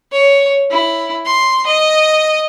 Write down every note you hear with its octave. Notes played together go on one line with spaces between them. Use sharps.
C#5
E4
C6
D#5